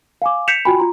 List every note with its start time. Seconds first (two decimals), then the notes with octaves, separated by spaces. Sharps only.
0.22 F5 G#5 D6
0.48 G6 B6 C#7 E7 F7
0.65 F4 F#4 G5 G#5 B5
0.78 F4 A#5 C6